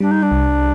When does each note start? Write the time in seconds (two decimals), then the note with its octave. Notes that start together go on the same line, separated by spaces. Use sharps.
0.01 G3 D4
0.11 D#4
0.23 D4
0.31 C2